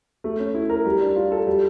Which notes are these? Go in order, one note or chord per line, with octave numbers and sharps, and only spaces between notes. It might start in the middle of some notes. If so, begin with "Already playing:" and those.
A3
C#4
E4
A#4
G3
D4
F4
A4
G3